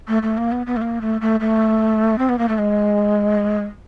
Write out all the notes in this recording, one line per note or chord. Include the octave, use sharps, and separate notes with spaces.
A3
A3
A#3
B3
B3
A3
A#3
A3
A3
A3
C4
B3
A#3
A3
G#3